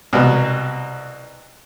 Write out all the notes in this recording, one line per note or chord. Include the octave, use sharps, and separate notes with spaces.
C2 B2